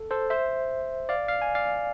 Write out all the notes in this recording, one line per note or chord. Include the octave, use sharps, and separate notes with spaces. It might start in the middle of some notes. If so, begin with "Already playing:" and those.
Already playing: A4
A4 C5
C5 E5
D5 F5
F5
G#5
D5 F5